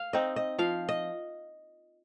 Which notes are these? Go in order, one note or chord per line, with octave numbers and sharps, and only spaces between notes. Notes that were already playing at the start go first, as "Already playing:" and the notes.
Already playing: F5
C4 D#4 D#5
D#5
F3 F5
D#5